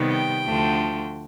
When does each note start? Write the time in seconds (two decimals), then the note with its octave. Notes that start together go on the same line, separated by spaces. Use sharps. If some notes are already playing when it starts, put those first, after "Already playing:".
Already playing: C3 D#3 G3 B3
0.11 G5
0.45 D2 D3 F3 A3